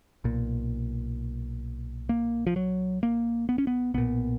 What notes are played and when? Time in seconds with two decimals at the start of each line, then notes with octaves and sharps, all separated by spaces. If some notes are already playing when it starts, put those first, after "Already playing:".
0.24 B1 A#2
2.09 A#3
2.47 F3
2.56 F#3
3.03 A#3
3.49 B3
3.58 C#4
3.67 B3
3.94 B1 A#2 B3